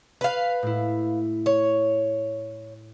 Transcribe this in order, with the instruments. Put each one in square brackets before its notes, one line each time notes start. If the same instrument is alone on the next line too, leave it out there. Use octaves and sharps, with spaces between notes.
[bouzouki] B4 F5
[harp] A2 E4
[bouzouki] C#5